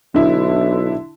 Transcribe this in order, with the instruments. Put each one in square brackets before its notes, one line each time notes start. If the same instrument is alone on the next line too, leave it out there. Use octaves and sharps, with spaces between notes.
[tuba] B1 [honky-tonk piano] D3 E4